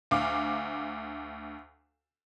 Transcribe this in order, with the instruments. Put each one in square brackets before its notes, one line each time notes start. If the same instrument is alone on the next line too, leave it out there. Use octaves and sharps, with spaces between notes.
[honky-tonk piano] D2 F5 D6